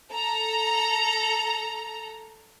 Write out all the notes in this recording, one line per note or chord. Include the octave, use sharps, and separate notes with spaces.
A4 A#5